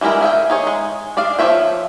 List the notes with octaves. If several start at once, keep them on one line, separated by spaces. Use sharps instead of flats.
E3 G3 G#3 E4 A#4
G#4 E5 F#5 G5
D#4 G#4 C#5
G#3
D4 D5 D#5 F5
F3 A4 C#5 E5 G5